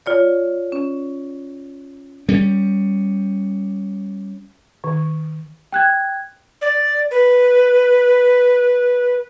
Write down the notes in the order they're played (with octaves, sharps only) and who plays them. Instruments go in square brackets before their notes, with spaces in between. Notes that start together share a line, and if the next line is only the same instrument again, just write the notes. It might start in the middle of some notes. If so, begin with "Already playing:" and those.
[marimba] F4 C#5 D5
C#4
[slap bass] G3 C#4
[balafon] D#3
[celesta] G5 F#6 G#6
[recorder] D5
B4